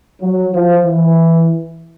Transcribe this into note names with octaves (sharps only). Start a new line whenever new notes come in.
F#3
F3
E3